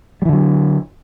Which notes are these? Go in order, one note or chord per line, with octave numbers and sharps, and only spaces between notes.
D3 E3 F#3 G3